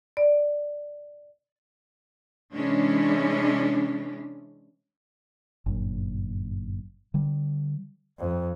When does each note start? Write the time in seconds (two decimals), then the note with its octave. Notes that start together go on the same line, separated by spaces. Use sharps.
0.17 D5
2.53 C3 E3 G#3 C#4 D4
5.66 G1 F#2 A#2
7.14 D3 G3
8.19 F2